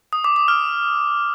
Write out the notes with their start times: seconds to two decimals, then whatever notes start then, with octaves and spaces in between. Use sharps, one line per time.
0.13 D#6
0.24 D6
0.36 D6
0.48 F6